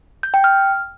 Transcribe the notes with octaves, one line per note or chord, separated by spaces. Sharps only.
G6
G5
F6